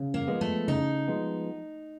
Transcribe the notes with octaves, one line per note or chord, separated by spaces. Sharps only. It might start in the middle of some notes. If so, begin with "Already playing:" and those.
Already playing: C#3
A#3
F3 G#3 B3
A3
C#3 D#4
F3 G#3 B3